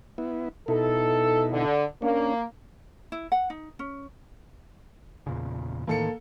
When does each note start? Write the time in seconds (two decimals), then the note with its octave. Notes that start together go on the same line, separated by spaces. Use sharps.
0.18 B3 E4
0.68 B2 D#4 E4 A4
1.52 D3
2.02 A#3 C#4 D4
3.12 E4
3.32 F#5
3.50 D#4
3.79 C#4
5.27 E2 A#2 C#3
5.87 A2 D#3 E3 A#3 A4 C#7